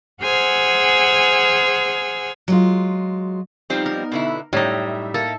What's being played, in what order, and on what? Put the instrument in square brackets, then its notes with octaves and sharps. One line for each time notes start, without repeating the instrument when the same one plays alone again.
[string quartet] G#4 C5 F#5 G#5 E6 F6
[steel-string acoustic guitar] F#3 G#3 F4
[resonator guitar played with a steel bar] F3 G3 C4 [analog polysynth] B3 D#4
[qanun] A#4
[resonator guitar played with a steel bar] B2 D3 E4
[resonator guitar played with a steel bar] F#2 [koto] A2 D#4 [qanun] G3 [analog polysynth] E5
[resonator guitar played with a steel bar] A#3 [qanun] A4